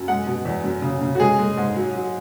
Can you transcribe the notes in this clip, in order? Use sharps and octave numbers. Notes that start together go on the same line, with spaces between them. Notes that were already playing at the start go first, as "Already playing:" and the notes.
Already playing: F#2
G#3 F#5
B2
E2
F#2
C#3
C#3
F#4
G#3 G#4
G#3
G#2
F#3
F#3